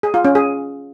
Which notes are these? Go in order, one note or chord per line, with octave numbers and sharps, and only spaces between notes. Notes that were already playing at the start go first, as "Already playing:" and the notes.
G#4
F4
C#4
G#4